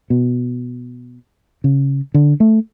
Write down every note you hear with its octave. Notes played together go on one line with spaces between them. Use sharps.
B2
C#3
D3
A3